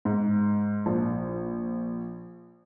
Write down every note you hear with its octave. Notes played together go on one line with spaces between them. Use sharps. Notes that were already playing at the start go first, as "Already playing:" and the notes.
G#2
A#1